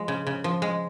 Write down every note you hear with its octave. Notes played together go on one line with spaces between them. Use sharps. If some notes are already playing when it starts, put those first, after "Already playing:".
Already playing: F3 G#3
C#3
C#3
F3
G#3